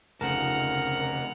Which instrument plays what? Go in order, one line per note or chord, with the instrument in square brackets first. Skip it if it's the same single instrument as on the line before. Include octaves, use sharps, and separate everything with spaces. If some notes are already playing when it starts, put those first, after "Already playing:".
[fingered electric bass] F1 [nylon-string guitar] D2 C#3 A5 [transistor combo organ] A#4 [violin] F#5 F7